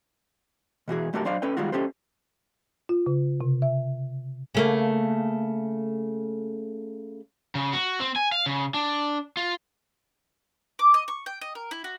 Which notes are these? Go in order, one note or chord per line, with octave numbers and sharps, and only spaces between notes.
B2 E3 F#4 G#4
B1 A3 F#4 G4 A#4 A5
F#3 D4 C5 D5 F5
C#4 A4 B4 G5
D#3 G3 G#3 F4 F#4
C#4 G4 A4 C5
F4
C#3
C3
E5
C#3 A3 A#3
C#3
F#4
C4
G#5
F5
C#3
D4
F4
D6
D#5
C#6
G5
D#5
A#4
E4
F#4